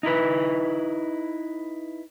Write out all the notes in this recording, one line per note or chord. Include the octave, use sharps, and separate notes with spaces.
D#4 E4 A4 B4